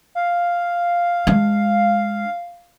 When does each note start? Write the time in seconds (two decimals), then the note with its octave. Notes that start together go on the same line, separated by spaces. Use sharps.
0.15 F5
1.27 G#3 D4